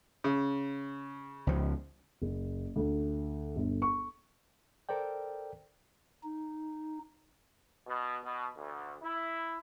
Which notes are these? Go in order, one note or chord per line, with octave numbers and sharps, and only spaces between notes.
C#3
C#2 F3
F#1
D2
G1
C#6
A4 A#4 C5 D5 G5
D#4
B2
B2
D2
E4